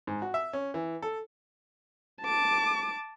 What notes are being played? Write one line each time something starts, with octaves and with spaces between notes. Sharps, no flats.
G#2
F#4
E5
C#4
E3
A4
A5 D6